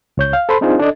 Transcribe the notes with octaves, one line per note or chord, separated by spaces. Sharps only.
C#2 C#5 G6
F5
A4 C5 B5 C6
C4 D4 D#4 F4 G#4 C5
D4 A4 D5 D#5